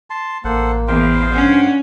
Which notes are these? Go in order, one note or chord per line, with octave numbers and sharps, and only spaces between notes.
A5 C6
A1 A#3 A4 C5 F#5
E2 C5 F5 G5
G2 C#4 F#5